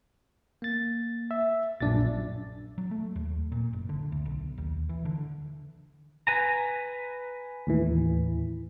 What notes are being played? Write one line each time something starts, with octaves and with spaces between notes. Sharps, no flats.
A#3 A6
E5
A#1 F#2 A#2 D4 D5 A6
F#3
A3
D#2
A#2
F#1
D3
D2
B1
D#2
E3
D3
B4 G#5 A#5
D#2 A2 E3